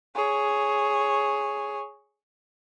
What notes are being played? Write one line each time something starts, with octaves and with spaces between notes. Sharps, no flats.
G#4 C#5